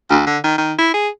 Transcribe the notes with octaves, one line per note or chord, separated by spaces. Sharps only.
D2
D3
D#3
D#3
E4
G#4